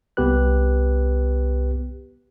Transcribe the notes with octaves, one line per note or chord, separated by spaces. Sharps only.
C2 B3 G4 B4 F#6